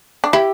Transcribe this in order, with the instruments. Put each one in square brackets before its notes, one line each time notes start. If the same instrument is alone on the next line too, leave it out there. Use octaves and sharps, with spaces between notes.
[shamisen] D4
[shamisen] E4 [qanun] G4